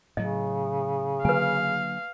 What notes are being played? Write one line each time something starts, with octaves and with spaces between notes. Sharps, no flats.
A2 C#3 F#3 D#5
D3 F#3 A#3 B4 F5 G#5